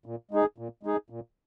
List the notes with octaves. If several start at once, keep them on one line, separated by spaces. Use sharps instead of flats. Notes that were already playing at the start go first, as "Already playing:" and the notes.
A#2
G#3 D#4 G#4
A#2
G#3 D#4 G#4
A#2